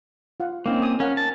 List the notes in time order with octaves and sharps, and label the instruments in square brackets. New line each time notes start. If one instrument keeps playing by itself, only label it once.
[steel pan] F4 F5 F#5
[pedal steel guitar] A#3 C4 [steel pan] C#4 D#4 F5
[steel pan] G#5 D6 D#6
[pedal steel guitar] C#4 [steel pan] A#4 F5 F#5
[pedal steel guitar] A5